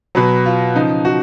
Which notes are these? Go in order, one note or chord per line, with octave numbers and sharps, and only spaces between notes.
B2 F#3 B4
F4
C#3 F3 D#4
F#4